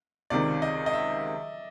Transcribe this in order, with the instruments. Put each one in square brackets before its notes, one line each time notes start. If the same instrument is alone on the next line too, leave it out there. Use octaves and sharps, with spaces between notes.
[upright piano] C#2 C3 D#3 [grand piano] D5
[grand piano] D#5
D#5
E5